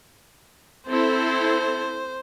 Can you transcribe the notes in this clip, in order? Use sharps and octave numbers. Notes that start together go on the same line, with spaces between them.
C4 E4 A4 C5